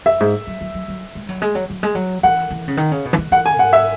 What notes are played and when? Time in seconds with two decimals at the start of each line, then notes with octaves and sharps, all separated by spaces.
0.05 F#2 E5
0.20 G#2
0.47 F#3
0.61 F#3
0.74 F#3
0.88 F#3
1.15 G#3
1.29 F#3
1.42 G#3
1.55 F#3
1.70 F#3
1.83 G#3
1.95 F#3
2.23 E3 F#5
2.50 E3
2.68 C#3
2.77 D#3
2.92 C#3
3.05 B2
3.13 E3
3.18 D#3
3.32 E3 F#5
3.46 G#5
3.59 G#2 F#5
3.73 E5